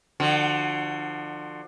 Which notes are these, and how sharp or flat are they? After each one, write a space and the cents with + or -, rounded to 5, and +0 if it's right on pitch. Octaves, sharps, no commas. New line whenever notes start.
D3 +30 F3 +0 F#4 +0